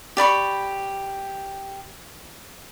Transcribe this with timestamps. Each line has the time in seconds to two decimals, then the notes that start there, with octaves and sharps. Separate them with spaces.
0.17 G4 D5 B5 C#6